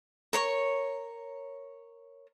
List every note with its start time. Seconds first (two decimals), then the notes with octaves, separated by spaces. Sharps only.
0.33 A#4 C#5 C#6